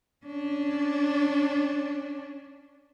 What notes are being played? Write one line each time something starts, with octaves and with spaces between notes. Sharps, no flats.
C#4 D4